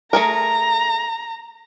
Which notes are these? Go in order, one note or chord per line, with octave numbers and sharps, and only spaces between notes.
A3 G#4 A#4 A#5